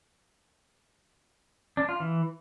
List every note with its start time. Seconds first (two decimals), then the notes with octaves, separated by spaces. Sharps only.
1.77 D4
1.89 F4
2.00 E3